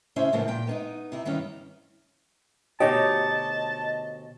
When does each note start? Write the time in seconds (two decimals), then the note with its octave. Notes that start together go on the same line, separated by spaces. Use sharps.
0.16 A2 C#3 C#4 E4 C5 E5
0.32 A2 C#3 F3 A#3 B3
0.48 A#2 G5
0.67 B3 D4 D#4
1.12 C3 E4
1.25 G2 D#3 E3 B3 C#4
2.80 D2 B2 D#4 G4 C#5 D#5 A5